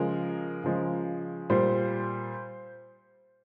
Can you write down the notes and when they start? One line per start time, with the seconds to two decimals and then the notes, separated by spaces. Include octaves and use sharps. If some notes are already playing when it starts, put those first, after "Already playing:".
Already playing: C#3 F3 G#3 A#4
0.64 C#3 F3 G#3
1.50 A#2 G3 C5